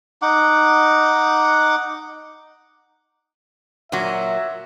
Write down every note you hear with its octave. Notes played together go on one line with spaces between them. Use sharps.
D#4 F#5 D6
A#2 F#3 E5